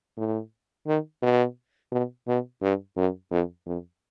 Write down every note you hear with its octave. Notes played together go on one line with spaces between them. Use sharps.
A2
D#3
B2
B2
B2
G2
F#2
F2
F2